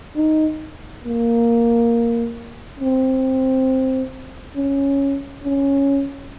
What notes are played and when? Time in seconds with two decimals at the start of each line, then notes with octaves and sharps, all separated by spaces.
0.16 D#4
1.05 A#3
2.80 C4
4.56 C#4
5.44 C#4